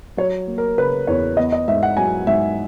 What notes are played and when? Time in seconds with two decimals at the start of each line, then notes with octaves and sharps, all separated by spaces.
0.17 F#3 C#5
0.47 A#3
0.58 A#4
0.78 C#3 B4
1.07 E2 C#5
1.37 B3 D#5
1.52 D#5
1.68 G#2 E5
1.83 F#5
1.97 F#3 G#5
2.27 G#2 E5